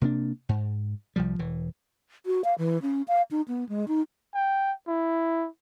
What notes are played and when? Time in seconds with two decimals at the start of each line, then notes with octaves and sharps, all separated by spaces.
0.01 C3 A#3 C4 D4
0.49 G#2
1.16 C2 F3 G3
1.39 E1 E3
2.26 F#4
2.44 F5
2.58 E3
2.82 C#4
3.08 F5
3.31 D#4
3.48 B3
3.69 G#3
3.88 D#4
4.34 G5
4.88 E4